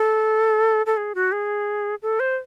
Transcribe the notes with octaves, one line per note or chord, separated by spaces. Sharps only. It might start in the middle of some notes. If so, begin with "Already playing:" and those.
Already playing: A4
A4
G#4
F#4
G#4
A4
C5